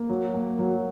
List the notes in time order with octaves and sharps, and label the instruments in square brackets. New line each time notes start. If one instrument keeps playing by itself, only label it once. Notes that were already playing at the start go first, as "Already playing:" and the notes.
Already playing: [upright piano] A#3
F#3
A#3
F#3